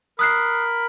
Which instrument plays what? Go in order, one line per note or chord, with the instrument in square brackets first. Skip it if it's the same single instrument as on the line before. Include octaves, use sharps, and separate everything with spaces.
[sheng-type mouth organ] A#4 B5 [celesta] D#6 F#6 C7